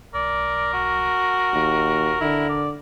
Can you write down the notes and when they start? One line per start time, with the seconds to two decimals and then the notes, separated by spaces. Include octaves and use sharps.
0.14 B1 A#4 D5
0.73 F#4
1.53 D#1 D#2
2.20 D3 E4
2.49 D5